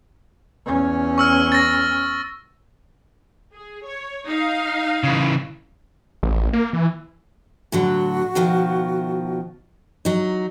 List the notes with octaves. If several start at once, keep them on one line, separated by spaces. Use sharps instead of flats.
E2 C#4
C#6 E6 F6
A6 A#6
G#4
C#5
D#4 F5
C#3 E3
A1
A#3
E3
A2 D3 F#3 F#4
B2 D#3 F3
F#3 D#4